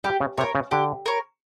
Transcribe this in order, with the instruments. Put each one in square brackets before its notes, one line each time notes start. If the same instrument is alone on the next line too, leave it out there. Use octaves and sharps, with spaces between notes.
[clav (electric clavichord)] G3 [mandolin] G4
[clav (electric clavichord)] C#3
[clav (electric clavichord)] C3 [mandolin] C#5
[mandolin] A#4
[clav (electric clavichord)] C#3
[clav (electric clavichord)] D3 [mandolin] G4
[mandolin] A#4 C#5